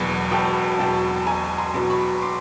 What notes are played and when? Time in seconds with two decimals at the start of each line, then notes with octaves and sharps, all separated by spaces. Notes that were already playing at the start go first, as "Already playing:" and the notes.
Already playing: E1 E2 B2 F#3 F#5 G#5
0.31 E1 G5 A5
0.79 E2 B2 F#3 G5 A5
1.16 A5
1.26 E1 G#5 A#5
1.58 A#5 C6
1.74 E2 B2 F#3
1.90 B5 C#6
2.22 C6 D6